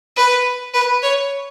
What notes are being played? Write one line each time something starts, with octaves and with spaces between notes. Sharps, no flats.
B4
B4
C#5